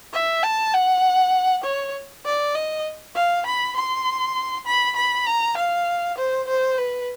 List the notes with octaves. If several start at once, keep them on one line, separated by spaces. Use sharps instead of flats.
E5
A5
F#5
C#5
D5
D#5
F5
B5
C6
B5
B5
A#5
F5
C5
C5
B4